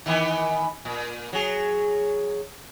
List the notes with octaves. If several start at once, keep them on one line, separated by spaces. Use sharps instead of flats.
D#3 E3 B3
A#2
F#3 G#4